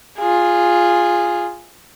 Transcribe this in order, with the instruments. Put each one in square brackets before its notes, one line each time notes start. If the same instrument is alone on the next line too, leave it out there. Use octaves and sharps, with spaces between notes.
[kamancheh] F4 G#4